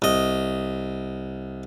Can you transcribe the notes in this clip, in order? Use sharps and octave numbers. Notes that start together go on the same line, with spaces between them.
C2 D#5